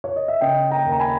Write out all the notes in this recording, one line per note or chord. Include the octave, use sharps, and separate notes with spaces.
C#5
D#5
E5
C#3 D#5 G5
G5 A#5
D#2
A#5
G#5 B5